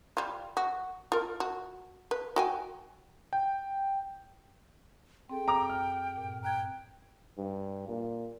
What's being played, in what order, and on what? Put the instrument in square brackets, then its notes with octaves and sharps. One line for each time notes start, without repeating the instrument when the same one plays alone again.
[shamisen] G3 F4
F#4
F4 A#4
F#4
B4
F#4 G5 G#5
[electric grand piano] G5
[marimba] C4 G#4 A4 [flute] G5
[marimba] F#2 E6 [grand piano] A#5 D6 F7
[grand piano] F6
[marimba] G2 A#2
[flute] G5 [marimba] A#5 F#6 G#6
[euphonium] G2
A#2